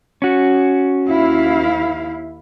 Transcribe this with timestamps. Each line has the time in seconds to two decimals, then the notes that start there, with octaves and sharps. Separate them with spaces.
0.22 C#4 F#4
1.08 D#2 E4 F5